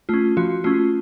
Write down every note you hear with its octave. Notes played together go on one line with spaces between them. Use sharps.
A3 C#4 F4
F3 F#4
A3 C#4 F4